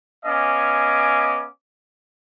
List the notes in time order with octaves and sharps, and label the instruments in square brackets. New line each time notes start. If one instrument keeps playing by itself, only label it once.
[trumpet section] B3 C#4 D#5 F5 G#5 D6